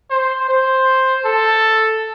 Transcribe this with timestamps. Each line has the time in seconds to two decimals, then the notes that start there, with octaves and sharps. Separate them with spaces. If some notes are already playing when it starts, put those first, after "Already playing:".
0.10 C5
0.49 C5
1.25 A4